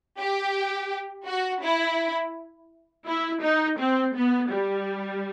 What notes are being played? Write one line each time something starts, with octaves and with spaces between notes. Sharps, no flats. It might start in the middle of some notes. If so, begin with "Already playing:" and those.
G4
F#4
E4
E4
D#4
C4
B3
G3